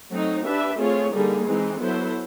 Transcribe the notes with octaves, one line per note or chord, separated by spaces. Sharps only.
F#3 A3 C4 D#4
D4 G4 B4 E5
A3 C4 F4 G#4 C#5
D3 G3 A#3 D#4 G#4
E3 G#3 C4 D#4
F#3 B3 E4 A4 C5